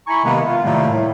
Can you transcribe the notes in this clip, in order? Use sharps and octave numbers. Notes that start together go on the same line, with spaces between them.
E4 G#5 A#5 B5 C#6
C3 D#3 G#3 A#3 B3
F4
A2 C3 D#3 G3 A3 A#3
A2